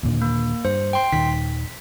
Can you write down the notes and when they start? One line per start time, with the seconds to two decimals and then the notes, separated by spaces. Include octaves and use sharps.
0.03 D#2 A#2 D3
0.22 A#3
0.65 G2 C5
0.93 G5 C6
1.13 D#1 D#3 B6